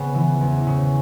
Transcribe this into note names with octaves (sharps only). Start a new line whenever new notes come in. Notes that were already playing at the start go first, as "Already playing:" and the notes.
Already playing: C#3 B3
E3
E2
C#3